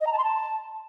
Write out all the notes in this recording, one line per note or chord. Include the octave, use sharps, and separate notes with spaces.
D#5
A#5
A5
C6
A5